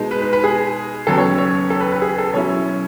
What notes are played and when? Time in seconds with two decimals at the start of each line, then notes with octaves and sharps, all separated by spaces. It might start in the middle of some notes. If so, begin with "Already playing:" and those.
Already playing: B2 G#3 D#4
0.11 B4
0.22 B4
0.33 B4
0.44 G#4
1.07 D#2 C#3 F#3 B3 A4
1.18 C#5
1.38 C#5
1.70 A4
1.81 B4
1.92 B4
2.02 G#4
2.18 A4
2.33 B2 F#3 C#4 E4 C#5